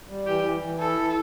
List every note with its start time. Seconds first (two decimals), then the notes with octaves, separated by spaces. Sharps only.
0.08 G3
0.26 E3 G4
0.43 E3
0.61 E3
0.78 E4 A4
0.96 E3